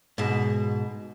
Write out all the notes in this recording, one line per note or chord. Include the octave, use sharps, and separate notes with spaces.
G#2 B2